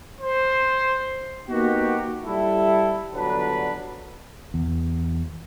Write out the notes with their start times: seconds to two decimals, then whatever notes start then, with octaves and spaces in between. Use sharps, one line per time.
0.21 C5
1.49 A#3 B3 D#4 F#4 G4
2.26 G3 E4 A4
3.14 G1 D3 F#3 D4 B4
4.54 E2